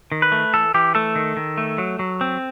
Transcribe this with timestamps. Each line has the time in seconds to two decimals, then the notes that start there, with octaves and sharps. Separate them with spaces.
0.12 D#3
0.22 B4
0.32 A3
0.54 E3 A4
0.74 E3 G4
0.95 A3 A4
1.16 D#3
1.37 D#3
1.57 A3
1.78 F#3
1.99 F#3
2.21 C4